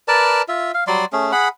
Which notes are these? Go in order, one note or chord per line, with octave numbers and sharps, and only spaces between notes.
A#4 B4 D5 A5
F4 E5
F5
F#3 G3 D5 C6
A3 C#4 G#4
G#4 F#5 B5